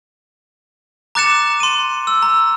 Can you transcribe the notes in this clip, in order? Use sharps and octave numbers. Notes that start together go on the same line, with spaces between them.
A#5 D6 F#6 A6 C#7 E7
C6 D#7
E6
A#5